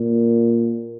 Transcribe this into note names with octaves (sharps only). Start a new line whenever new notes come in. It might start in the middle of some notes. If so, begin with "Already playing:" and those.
Already playing: A#2